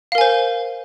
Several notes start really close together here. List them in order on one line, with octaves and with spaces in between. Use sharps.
F5 A#4 G#5 C5